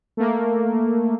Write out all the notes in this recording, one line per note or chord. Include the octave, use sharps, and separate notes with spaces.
A3 A#3